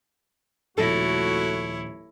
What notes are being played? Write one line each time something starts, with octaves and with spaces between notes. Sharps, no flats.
D#1 F3 A3 E4 F#4 A4 C#5 A#6